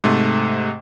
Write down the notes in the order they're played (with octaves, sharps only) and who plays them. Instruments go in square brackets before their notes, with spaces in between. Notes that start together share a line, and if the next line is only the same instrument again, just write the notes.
[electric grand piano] G#2 C3 A3